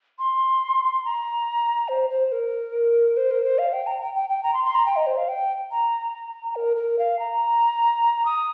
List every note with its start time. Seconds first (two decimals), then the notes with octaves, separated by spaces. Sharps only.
0.19 C6
1.05 A#5
1.89 C5
2.10 C5
2.32 A#4
3.17 C5
3.31 A#4
3.44 C5
3.59 F5
3.73 G5
3.87 A#5
4.01 G5
4.15 G5
4.30 G5
4.43 A#5
4.54 C6
4.65 C6
4.75 A#5
4.86 G5
4.96 D#5
5.07 C5
5.17 F5
5.28 G5
5.71 A#5
6.56 A#4
6.77 A#4
6.99 F5
7.19 A#5
8.26 D#6